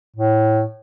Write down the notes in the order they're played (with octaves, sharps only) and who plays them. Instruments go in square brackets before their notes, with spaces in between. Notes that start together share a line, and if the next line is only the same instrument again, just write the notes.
[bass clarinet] A2